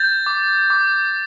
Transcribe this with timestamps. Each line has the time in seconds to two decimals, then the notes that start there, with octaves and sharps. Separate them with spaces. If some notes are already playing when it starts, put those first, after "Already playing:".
Already playing: G6 A6
0.26 D6
0.70 D6